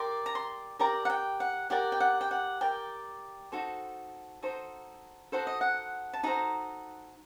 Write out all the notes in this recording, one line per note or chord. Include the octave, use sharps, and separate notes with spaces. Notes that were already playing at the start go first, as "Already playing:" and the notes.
Already playing: G4 A#4 D5 C6
A#5
C6
G4 A#4 D5 A#5
F#5
G5
F#5
G4 A#4 D5 F#5
G5
F#5
G5
F#5
G4 A#4 D5 G5
D#4 F#4 A4 C5
D#4 F#4 A4 C5
D#4 F#4 A4 C5 F#5
D#5
F#5
A5
D#4 F#4 A4 C5 A#5